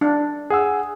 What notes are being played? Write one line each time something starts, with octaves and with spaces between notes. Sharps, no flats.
D4
G#4 F#5 E6